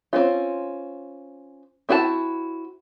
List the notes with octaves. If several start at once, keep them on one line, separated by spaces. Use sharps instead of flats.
C4 C#4 F4
C4 E4 F#4 G#4 A5